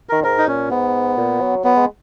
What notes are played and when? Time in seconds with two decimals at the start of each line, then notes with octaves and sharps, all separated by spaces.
0.09 D#3 A#4
0.24 G#2 A#4
0.38 D#4
0.48 A#2 C#4
0.71 G#2 B3
1.18 A#2
1.41 F#3
1.64 F#3 B3
1.76 G#3